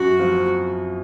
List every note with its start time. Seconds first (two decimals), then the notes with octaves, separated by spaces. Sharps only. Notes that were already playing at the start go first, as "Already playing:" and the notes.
Already playing: F#2 F#4
0.19 F3 C4 F4